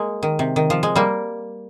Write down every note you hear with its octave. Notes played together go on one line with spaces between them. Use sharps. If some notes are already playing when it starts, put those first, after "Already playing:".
Already playing: G#3 A#3
D#3
C3
D#3
F3
G#3
G3 A#3